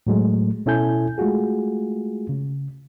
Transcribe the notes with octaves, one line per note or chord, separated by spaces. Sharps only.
A2 F#3 G#3 A3
B2 C#4 E4 A4 G#5 G6
G#3 A3 F4 F#4 G#4
C#3